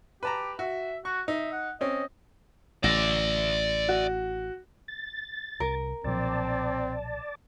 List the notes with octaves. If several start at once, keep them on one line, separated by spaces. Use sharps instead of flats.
G4 B4 A5 A#5
F#4 E5
F#4 C#6
D#4 E5
F#5
C4 C#4 D#5
A1 D5 E5 A#6
F#4
A6
C2 A#4
B1 A#2 F3 C4 D5 A5